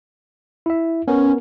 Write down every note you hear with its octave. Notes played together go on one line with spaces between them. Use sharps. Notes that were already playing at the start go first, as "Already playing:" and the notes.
E4 E5
B3 C#4 A#4